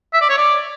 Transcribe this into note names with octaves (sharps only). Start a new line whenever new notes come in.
E5
D5
C#5
D5